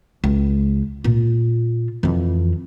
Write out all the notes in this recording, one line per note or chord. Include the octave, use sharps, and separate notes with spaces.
C#2
A#2 F4
F2 E3